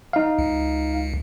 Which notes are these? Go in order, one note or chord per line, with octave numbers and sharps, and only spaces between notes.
D#4 F5
C#2